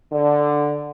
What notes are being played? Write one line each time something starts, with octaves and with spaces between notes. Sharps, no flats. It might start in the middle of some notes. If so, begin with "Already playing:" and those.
D3